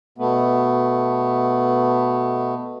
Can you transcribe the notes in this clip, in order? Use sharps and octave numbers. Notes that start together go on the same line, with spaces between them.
B2 A3 B3